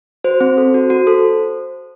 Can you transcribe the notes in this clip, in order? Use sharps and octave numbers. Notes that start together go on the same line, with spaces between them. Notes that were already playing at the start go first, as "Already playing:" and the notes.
F#4 C5
C4
A4
F#4
F#4
A4